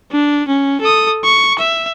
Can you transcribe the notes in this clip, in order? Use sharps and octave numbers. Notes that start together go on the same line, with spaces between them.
D4
C#4
A4 D#6
C#6
E5